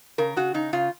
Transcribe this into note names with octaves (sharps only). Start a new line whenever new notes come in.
C#3 A#4
C#3 F#4
C#3 D#4
C#3 F4